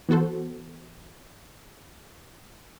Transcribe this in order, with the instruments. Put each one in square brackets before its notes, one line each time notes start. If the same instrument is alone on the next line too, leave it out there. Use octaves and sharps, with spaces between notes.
[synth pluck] E3 B3 F#4 A4 C5